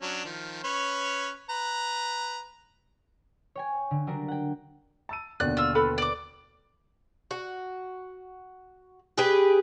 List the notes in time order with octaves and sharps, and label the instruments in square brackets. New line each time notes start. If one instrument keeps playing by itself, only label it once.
[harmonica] F#3 C#4 D4
D#3 F3
C#4 B4 C#5
B4 A#5
[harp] C#5 G5 G#5
D3
F#3 G3 D4 A#4
F#5 G5
[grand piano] A5 E6 D#7
[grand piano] D#2 B2 D3 [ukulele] D5 [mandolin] F#6
[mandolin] F4 E6
[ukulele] A4 B4 B5
[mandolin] D5 D6
[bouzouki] F#4
G4 G#4 B4